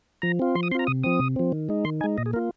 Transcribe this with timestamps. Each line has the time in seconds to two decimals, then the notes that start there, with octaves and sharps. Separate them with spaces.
0.22 F3 A#5
0.39 C4 F4
0.55 F3 C6
0.63 D#6
0.71 C4 C6
0.75 F4 A#5
0.87 C3 D#6
1.03 F3 C4 D#6
1.19 C3
1.36 F3 C4
1.52 D#3
1.69 G#3 D#4
1.84 D#3 C6
2.01 D#4 G#5
2.04 G#3
2.18 A#2 D#5
2.26 G#4
2.33 A#3 A#4
2.36 F4